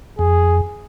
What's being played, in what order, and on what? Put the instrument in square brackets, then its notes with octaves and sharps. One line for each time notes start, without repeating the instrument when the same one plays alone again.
[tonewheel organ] F2 [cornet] G#4